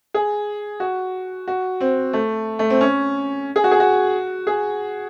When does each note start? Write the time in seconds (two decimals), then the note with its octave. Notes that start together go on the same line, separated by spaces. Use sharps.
0.14 G#4
0.80 F#4
1.48 F#4
1.81 C4
2.13 A3
2.59 A3
2.70 C4
2.81 C#4
3.56 G#4
3.64 F#4
3.71 G#4
3.80 F#4
4.47 G#4